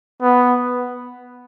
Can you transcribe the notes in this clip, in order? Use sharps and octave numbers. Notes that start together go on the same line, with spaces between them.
B3